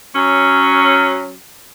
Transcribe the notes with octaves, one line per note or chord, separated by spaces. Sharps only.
F#3 C#4